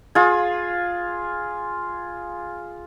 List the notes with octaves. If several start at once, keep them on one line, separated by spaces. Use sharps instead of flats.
F4 G#4